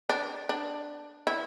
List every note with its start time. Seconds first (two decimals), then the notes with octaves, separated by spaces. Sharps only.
0.09 D4
0.49 D4
1.27 E4